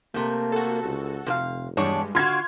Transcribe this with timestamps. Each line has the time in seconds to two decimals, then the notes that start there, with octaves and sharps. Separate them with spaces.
0.14 C3 A3 A#3 G6
0.52 F#4 A4
0.84 C#2
1.27 F1 C3 B4 F5
1.77 E2 G2 G3 G#3 D4 C#5
2.15 D3 F4 F#4 F5 C6 F6 G#6